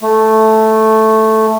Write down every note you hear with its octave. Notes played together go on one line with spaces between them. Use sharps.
A3